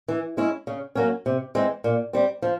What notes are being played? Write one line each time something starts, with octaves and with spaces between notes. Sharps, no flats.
E3
G#3 C#4 E4
C#3
F#3 A#3 C#4
C3
E3 G#3 C4
A#2
G3 C4
F3